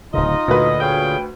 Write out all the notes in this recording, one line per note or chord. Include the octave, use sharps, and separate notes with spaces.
D1 C#3 D#4 F4 D#5
D2 A#2 D3 B4
G#4 C#5 F5 G5